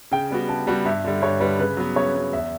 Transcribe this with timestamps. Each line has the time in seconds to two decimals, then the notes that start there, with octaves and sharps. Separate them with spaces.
0.11 C#3 G5
0.31 G3 B3 F#4
0.48 C#3 A5
0.67 G3 B3 F#4
0.85 G2 E5
1.04 D3 G3
1.22 G2 C#5
1.40 D3 G3 B4
1.59 C#3 B4
1.77 F#3 B3
1.95 C#3 C#5
2.15 F#3 B3
2.33 E2 E5